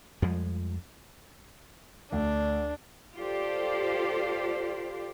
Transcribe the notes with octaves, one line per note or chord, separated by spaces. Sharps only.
F2 F3 G3 G#3
D2 D4
F4 G4 A4 C5 D5